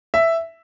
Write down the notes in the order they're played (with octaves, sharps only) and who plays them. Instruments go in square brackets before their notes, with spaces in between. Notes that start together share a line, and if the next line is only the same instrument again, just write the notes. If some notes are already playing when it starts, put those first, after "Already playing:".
[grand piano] E5